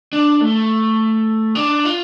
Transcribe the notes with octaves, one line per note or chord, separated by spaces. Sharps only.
D4
A3
D4
F4